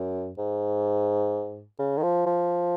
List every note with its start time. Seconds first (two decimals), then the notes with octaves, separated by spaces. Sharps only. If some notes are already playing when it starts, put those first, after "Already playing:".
Already playing: F#2
0.38 G#2
1.79 C#3
1.97 D#3
2.03 F3
2.26 F3